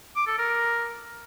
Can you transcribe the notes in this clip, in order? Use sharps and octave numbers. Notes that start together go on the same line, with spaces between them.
D6
A4
A#4